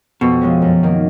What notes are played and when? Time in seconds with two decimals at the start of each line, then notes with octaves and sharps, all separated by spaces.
0.21 F2 B2
0.41 F3 G#3 C#4
0.62 F#2
0.83 D#3 A#3